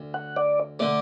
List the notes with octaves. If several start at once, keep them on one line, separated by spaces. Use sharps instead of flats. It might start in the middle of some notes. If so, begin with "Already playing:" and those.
Already playing: D2
F#5
D5
D3 A3 D5